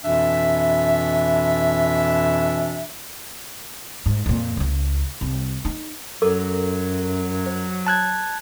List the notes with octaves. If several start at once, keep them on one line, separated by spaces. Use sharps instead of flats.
F2 B2 E3 D4 E5
G#2
F2 A#2
C#2 C#3
C2
D#4
F#2 F#3 A4 A#4 D6
C5
A5 F#6 G#6